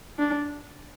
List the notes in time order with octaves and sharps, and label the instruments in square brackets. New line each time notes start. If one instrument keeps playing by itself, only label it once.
[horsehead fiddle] D4